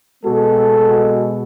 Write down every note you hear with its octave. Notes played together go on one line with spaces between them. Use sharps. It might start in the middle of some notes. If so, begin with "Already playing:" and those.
B2 G#3 B3 F#4 A4